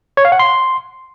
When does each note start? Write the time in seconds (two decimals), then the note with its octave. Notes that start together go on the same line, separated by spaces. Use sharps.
0.17 C#5
0.25 F5
0.32 F#5
0.39 C6